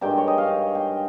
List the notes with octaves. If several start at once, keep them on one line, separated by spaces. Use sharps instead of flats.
G2 D#3 G#3 G5
C#5
D#5
F5
G5